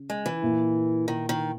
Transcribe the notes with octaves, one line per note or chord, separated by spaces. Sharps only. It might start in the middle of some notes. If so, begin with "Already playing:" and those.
Already playing: C#3
G#3
E3
A#2 A#3 E4
D#3
D#3